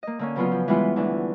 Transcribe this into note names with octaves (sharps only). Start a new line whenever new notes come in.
A#3 D#5
D3 A#3 C#4
C#3 F#3 B3 C#4 F4
F3
E3 G3 G#3 B3 E4 F4
D2 E3 D4